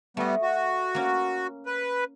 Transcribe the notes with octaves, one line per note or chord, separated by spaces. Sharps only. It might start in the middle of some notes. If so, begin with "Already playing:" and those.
G3 A3 B3 D#5
F#4
A#3 C#4
B4